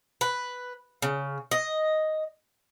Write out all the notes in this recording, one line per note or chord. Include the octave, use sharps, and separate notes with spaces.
B4
C#3
D#5